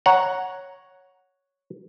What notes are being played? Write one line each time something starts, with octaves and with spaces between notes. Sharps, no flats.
C#5 F#5 A#5